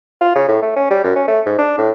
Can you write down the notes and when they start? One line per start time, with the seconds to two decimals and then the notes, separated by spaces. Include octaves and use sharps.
0.21 F4
0.35 C#3
0.48 A2
0.62 A3
0.76 C#4
0.90 G3
1.04 F#2
1.16 C#4
1.28 A3
1.46 G#2
1.59 D4
1.78 A2